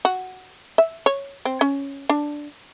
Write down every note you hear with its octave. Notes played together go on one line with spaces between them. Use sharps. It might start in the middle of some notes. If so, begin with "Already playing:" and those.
F#4
E5
C#5
C4
C#4
D4